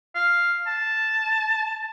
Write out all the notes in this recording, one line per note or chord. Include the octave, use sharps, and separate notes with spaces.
F5
A5